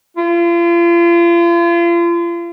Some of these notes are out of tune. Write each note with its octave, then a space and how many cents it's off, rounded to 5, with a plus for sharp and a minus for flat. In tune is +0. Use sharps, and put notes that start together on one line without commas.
F4 -40